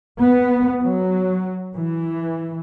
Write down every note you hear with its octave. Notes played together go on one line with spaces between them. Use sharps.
B3
F#3
E3